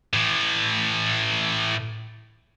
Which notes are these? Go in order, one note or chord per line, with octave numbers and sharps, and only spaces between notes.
A2 E3